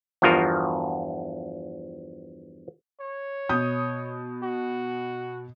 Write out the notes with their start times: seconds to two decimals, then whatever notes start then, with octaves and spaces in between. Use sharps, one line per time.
0.22 E2 G2 F3 F4 F#4 A#4
3.00 C#5
3.49 B2 D#6 G6
4.43 F#4